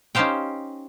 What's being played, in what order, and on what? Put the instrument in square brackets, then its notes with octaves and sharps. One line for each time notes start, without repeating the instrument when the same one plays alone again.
[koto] C#4 D#4 G4 C5 F5 G5